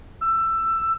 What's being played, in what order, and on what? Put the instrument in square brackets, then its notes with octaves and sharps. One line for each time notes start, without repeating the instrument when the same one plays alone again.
[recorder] E6